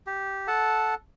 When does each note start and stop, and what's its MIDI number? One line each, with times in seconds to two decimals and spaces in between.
0.07 0.47 67
0.47 0.94 69
0.47 0.94 78
0.47 0.94 81